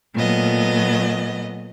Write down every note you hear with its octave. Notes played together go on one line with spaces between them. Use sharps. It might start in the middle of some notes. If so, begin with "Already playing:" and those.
A#2 F#3 A3 B3 D#5